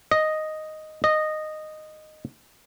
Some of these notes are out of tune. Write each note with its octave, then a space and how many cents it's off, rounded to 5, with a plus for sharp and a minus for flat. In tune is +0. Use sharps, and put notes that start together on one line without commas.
D#5 +0
D#5 -10